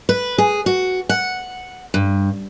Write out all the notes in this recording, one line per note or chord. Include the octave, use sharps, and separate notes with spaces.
B4
G#4
F#4
F#5
G2